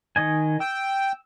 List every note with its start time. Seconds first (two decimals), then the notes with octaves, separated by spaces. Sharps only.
0.16 D#3 D#5 G#5
0.60 G5 E6